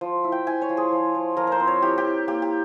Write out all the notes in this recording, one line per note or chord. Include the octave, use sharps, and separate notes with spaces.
F3
E4
G5
E4 G#5
C#5
F3
G#4
F3
F3
F3 A#4
A#4 C5
C4
C#5
E4 G4
G4
E4
A#3 G4
G4